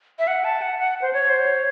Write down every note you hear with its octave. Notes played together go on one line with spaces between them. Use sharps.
E5
F#5
A5
F#5
F#5
C5
C#5
C5
C#5